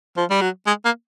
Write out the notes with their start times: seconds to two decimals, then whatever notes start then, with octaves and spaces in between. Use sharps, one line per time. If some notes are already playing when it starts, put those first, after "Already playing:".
0.17 F3
0.30 G3
0.41 F#3
0.66 G#3
0.85 A#3